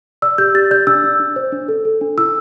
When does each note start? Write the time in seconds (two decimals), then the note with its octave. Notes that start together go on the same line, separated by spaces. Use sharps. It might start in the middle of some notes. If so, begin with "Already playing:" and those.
0.22 D5 E6
0.38 G4 G6
0.55 G4 A6
0.71 D5 G6
0.87 D4 E6
1.04 D4
1.20 D4
1.36 C5
1.52 D4
1.68 A4
1.85 A4
2.01 D4
2.18 E4 E6